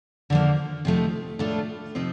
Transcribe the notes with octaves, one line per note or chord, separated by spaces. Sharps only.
D3 F3 A#3
C3 F3 A3 D#4
A2 A3 D4 F4 A4
C3 F3 C4 D#4